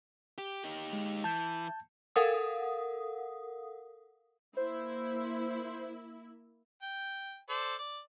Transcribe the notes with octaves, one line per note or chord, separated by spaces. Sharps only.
G4
D#4 G4
G#3
E3 A5 G6
A4 A#4 F5 F#5 D#6
A#3 E4 C5
G5
A4 C5 D5
D5